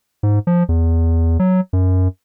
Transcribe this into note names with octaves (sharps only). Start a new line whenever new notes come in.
G#2
F3
E2
F#3
F#2